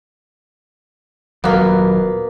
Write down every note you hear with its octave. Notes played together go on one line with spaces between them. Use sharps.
D#1 F#3 A#3 B3